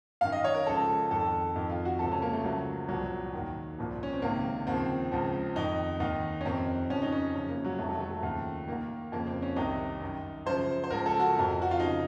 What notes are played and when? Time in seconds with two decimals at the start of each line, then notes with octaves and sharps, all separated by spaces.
0.21 F#2 D#3 F5
0.32 D#5
0.44 C#5
0.54 A#4
0.66 C#2 C#3 F3 A4
1.11 F2 D#3 A4
1.56 F2 D#3
1.70 F4
1.85 F#4
1.99 C#2 C3 F3 A4
2.12 C#4
2.22 A#3
2.33 A3
2.44 C#2 C#3 F3 F#3
2.88 C2 A#2 F3 F#3
3.33 D#2 D#3
3.78 C2 A#2 F3
4.03 C#4
4.13 C4
4.22 C#2 C3 D#3 A#3
4.67 D#2 C#3 F3 C4
5.12 C#2 C#3 F3
5.56 F2 D#3 D#4
6.00 D#2 D#3 D#4
6.41 C#4
6.45 F2 C3 D#3 C4
6.90 F2 C#3 F3 C#4
7.02 D#4
7.12 C#4
7.34 F#2 C#3 F3 C#4
7.49 A#3
7.65 F#3
7.78 F2 C3 D#3 A3
7.89 F#3
8.00 A3
8.23 D#2 C#3 F3
8.68 D#2 D#3 A#3
9.12 F2 C#3 F3 A#3
9.27 C4
9.42 C#4
9.56 C2 C3 D#3 D#4
10.01 F#2 D#3
10.46 F#2 C#3 F3 C5
10.84 C5
10.90 C#2 C#3 F3 A#4
11.06 A4
11.20 F#4
11.35 F2 C3 F3
11.62 F#4
11.71 F4
11.79 C#3 F3 D#4